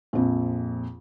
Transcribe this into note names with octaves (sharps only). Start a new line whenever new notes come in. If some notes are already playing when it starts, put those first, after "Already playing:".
A#1 F2